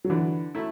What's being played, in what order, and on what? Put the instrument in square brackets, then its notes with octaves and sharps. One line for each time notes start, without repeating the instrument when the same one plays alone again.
[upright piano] F#3
[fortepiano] D3 [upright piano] E3
[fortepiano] F#3 A3 E4